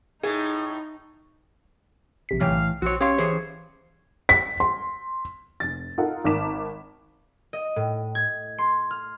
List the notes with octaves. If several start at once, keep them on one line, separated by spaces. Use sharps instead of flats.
A2 D#4 G#4
A#1 C3 B6
B1 A2 E3 C#5 F5 G5
A#1 C4 F#4 C#5
C#4 G4 C#5 F5 C6
E3 G#4 C5
B6
C6
F1 A6
D#4 F4 A4 A#4 F#5
G#1 A#4 A5 D6 B6 E7
D#5
A2
G#6
C6
F6